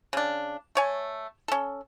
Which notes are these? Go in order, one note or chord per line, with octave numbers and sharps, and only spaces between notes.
C#3 D4
A3 C#5 G#5
C#4 A4